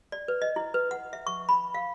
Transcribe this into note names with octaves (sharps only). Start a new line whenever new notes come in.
D5
B4
D#5
E4
B4
F#5
E5
C#6
B5
F5